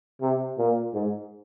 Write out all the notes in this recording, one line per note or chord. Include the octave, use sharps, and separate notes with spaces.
C3
A#2
G#2